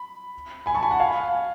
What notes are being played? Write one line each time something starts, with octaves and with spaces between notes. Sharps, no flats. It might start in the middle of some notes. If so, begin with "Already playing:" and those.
Already playing: B5
G#5 B5
A5 C#6
G#5 B5
F#5 A5
F5 G#5